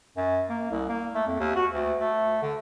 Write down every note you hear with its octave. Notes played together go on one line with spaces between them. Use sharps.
F#2
A#3
C2
A#3
A3
F2
D#2
F#4
D2
A3
D3